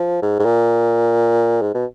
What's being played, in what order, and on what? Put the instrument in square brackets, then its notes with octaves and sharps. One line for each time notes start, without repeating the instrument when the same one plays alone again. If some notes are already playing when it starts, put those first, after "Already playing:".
Already playing: [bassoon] F3
G#2
G#2
A#2
G#2
B2